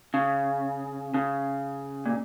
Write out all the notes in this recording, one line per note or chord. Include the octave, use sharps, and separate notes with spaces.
C#3
C#3
A#2